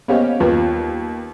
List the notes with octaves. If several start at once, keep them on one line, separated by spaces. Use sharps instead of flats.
A#3 B3 C#4 G4 C5 D#5
D#2 F4 B4